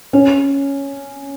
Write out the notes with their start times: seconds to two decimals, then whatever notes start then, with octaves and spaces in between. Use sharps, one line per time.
0.13 C#4